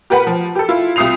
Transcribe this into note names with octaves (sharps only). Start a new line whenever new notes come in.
G4 A#4 B4 F#5 B5
F3
G4 A4
E4 F4
C2 F4 D#6 C7 F7